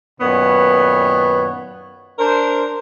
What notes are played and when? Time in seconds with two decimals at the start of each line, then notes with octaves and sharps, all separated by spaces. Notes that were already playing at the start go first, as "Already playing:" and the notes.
0.20 F#2 A#2 D#3 B3 B4 C#5
2.19 D4 A#4 C5